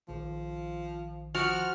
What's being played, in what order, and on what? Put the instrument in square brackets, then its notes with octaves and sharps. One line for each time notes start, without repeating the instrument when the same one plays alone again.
[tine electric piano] A#1 D#3 [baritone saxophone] F3
[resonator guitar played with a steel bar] F3 [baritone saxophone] F#4 [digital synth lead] F6